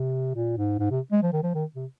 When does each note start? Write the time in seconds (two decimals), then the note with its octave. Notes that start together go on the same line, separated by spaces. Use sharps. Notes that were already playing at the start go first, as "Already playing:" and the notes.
Already playing: C3
0.35 A#2
0.57 G#2
0.79 G#2
0.90 C3
1.12 G#3
1.22 F3
1.33 D#3
1.43 F3
1.54 D#3
1.76 C3